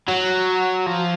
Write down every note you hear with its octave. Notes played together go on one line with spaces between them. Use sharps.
F#3
F3